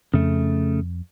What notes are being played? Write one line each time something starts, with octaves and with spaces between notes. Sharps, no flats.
F2 C#3 A3